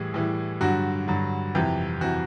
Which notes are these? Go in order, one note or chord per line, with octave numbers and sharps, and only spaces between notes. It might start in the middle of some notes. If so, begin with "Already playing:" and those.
Already playing: A2 E3 G3 G#4
A2 E3 G3
G2 D3 F#3 F#4
G2 D3 F#3
F2 C3 E3 G4
C3 E3 F#4